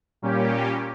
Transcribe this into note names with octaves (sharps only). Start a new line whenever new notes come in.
A#2 G3 A#3 C#4 G4